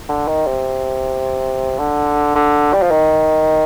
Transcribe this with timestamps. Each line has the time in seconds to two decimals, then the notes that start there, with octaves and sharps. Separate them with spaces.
0.09 D3
0.28 D#3
0.47 C3
1.78 D3
2.35 D3
2.73 G3
2.82 F3
2.91 D#3